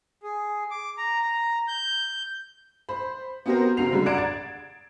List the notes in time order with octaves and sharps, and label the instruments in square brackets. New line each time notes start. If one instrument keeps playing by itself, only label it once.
[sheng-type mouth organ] G#4
D6
A#5
A#5
G6
[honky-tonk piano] C5 B5
B3 C4 F#4 G4 A#4 C5
C#3 C4 F#4 A#5 C7 F7
D3 G3 G#3
D5 F#5 A#5 G#6 D7 E7
A6